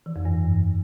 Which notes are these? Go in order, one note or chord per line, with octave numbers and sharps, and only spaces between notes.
E3
F2
G2